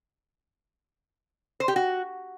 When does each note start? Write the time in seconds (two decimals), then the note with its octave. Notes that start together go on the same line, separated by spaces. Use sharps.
1.60 C5
1.68 G4
1.76 F#4